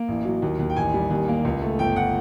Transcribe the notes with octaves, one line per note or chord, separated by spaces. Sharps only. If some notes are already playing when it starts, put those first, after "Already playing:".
Already playing: A#3
A1
F#3
D#2
D#2
G5
A1 G#5
G3
D#2
A#3
C#2
A3
G1 G5
F#5